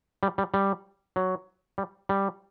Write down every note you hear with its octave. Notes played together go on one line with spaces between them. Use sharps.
G3
G3
G3
F#3
G3
G3